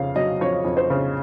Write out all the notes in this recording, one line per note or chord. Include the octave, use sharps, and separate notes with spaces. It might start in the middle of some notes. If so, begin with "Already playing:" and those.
Already playing: F2 C#3 F5
F#3 D#5
F2 C#5
F2
C5
C#3